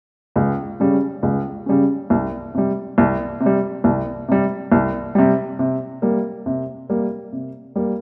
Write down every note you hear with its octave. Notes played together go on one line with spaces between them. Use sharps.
C#2
C#3 G3 C#4
C#2
C#3 G3 C#4
C2
C3 G3
C2
C3
G3
C2
C3 G3
C2
C3 G3
C3
G3 A#3
C3
G3 A#3
C3
G3 A#3